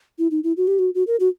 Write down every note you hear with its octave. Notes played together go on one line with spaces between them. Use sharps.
E4
D#4
E4
F#4
G4
F#4
F#4
A#4
F#4